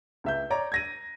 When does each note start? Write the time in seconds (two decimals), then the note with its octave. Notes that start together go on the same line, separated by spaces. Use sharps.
0.24 C#2 E5 G6
0.50 C#5 D5 A#5
0.72 G#6 A#6 D#7